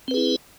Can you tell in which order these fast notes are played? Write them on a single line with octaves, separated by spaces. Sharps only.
C4 B4 G#4 E4